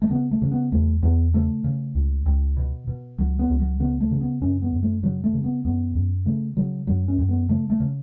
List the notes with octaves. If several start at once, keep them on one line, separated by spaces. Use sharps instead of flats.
A3
C#3 B3
A3
C#3
B3
E2 A3
E2 B3
C#3 A3
C#3
C#2
C#2
B2
B2
C#2 F#3
B3
C#2
F#3
C#3 B3
A3
C#3
B3
F#2 C#4
B3
F#2
A3
C#3 F#3
A3
C#3
B3
F#2 B3
F#2
C#3 A3
C#3 F#3
F#2 F#3
C#4
F#2
B3
C#3 A3
A3
C#3